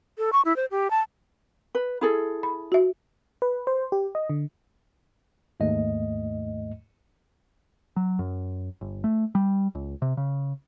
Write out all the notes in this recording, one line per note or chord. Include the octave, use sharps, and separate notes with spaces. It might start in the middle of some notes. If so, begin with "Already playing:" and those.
A4
C#6
E4
C5
G4
A5
B4
E4 G#4 A4
B5
F#4 E5
B4
C5
G4
D#5
D3
D#2 G#2 A3 D#5
F#3
F#2
G1
A3
G3
C#2
C3
C#3